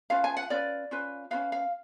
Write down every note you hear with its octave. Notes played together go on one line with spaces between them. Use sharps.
C#4 F4 B4 F5
G#5
F#5
C#4 F4 B4 D5
C#4 F4 B4
C#4 F4 B4 F5
F5